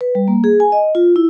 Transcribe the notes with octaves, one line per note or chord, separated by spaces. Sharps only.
B4
G3
A#3
G#4
G#5
D#5
F4
E4